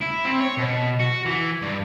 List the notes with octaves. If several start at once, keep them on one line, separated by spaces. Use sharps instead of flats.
E4
C4
C#5
B2
F#4
E3
G2